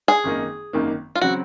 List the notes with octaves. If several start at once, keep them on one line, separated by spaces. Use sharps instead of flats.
G#4
G#1 F#2 D#3 A#3 D#4
G#1 F#2 D#3 A#3 D#4
F4
C#3 F#3 C4 F#4